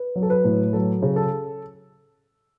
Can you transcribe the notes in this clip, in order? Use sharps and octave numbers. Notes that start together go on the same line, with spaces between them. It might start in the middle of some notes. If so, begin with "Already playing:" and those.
Already playing: B4
F#3
A4
B4
A2
F#3 A4
C#3
A4